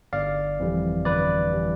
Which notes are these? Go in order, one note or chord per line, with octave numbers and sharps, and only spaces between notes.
G1 D5 F5
F2 E3 G3
G1 B4 D5
E3 G3